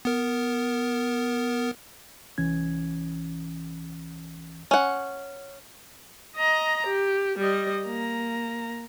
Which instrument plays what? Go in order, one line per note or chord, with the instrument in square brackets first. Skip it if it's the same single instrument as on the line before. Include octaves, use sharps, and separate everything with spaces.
[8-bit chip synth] B3 A#4
[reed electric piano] C2 E3 C#4 G#6
[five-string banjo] C#4 F#5
[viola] D#5 A#5
G4
G3 D#5
A#3 A#5